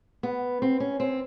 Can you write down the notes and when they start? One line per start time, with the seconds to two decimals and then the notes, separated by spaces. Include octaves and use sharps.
0.23 B3
0.62 C4
0.80 C#4
1.00 C4